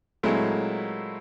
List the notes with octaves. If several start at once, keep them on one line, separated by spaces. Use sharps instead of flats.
A#2 F#3 G#3 A3 C4 E4